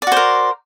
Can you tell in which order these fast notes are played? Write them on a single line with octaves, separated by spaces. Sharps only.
D5 F#4 C5 A#4